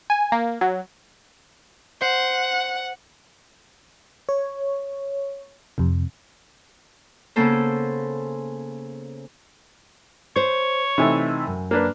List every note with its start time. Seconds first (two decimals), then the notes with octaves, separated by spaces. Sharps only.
0.10 G#5
0.32 A#3
0.61 F#3
2.02 C5 F#5
4.29 C#5
5.78 F2 C3
7.36 C#3 A#3 B3 C#4 A4 C5
10.36 C5 C#5
10.98 C3 E3 A3 D#4
11.47 F#2
11.71 A#3 D4 B4